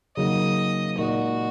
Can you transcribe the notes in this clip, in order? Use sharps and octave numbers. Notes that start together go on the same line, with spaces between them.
C#3 F#3 A#3 D#4 G#4 D#5
A#2 G#3 D#4 F#4 A#4 D#5